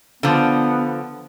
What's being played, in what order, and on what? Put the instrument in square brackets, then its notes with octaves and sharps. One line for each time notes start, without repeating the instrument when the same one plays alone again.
[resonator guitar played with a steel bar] D3 F3 [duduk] B3